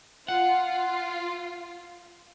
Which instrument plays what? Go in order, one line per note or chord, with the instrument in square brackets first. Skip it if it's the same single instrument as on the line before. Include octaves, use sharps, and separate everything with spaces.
[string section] F4 [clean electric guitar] F#5